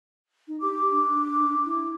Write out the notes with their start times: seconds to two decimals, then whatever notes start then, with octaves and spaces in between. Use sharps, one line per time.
0.48 D#4
0.61 G4 D6
0.91 D4
1.65 E4